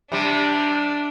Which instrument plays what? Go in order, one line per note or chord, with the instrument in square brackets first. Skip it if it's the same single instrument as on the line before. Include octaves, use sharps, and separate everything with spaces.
[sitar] C3 G3 [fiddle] D4